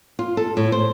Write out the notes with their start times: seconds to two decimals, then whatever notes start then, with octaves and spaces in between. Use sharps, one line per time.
0.19 F4
0.37 A4
0.57 A2
0.72 C5